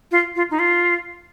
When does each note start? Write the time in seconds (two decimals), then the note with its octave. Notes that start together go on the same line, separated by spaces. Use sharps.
0.11 F4
0.36 F4
0.50 D#4
0.59 F4